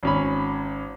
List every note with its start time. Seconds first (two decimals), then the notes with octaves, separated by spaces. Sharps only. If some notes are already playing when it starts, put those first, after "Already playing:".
0.03 G#1 C#4 B5